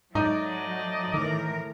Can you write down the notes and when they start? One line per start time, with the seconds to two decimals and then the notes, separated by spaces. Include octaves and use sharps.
0.15 G#2 F#3 A3 D#4 D5 D#5
1.14 A2 D#3 E3 A#4